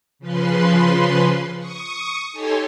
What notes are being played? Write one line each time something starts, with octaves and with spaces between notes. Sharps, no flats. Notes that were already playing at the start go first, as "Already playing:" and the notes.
C#3 F3 B4 C6
C#6 D#6
D#4 G4 A4 C#5 G#5 C6